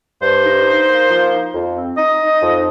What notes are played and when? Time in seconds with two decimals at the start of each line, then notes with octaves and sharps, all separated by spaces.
0.22 G2 C5
0.44 D#4
0.66 D#4
0.88 A#3
1.10 F3
1.32 D#4
1.54 F2
1.76 C4
1.97 D#4 D#5
2.20 D#4
2.42 F2